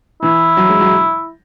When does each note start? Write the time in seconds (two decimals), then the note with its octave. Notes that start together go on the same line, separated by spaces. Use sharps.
0.22 E3 E4
0.57 F#3
0.69 G#3
0.80 F#3